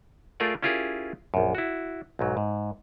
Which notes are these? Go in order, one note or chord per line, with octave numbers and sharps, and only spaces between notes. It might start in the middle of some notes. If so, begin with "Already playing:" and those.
A3 F4 G#4 A#4 D5
C#4 E4 F4 G4 G#4 A#4
A#1 F#2
E4 F#4
B1 G#2 F#3
G#2